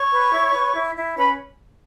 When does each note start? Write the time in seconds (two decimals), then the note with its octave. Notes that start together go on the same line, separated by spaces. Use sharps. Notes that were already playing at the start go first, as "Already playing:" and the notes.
Already playing: C#5 C#6
0.12 B4
0.33 E4
0.54 B4
0.74 E4
0.95 E4
1.16 C#4 B4 B5